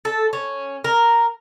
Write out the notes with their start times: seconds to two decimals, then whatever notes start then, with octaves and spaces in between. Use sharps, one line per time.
0.05 A4
0.33 C#4
0.84 A#4